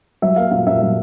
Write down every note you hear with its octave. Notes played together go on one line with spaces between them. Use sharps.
F#3 E5
A#3 F5
A#2 F5
A#2 E5
F#3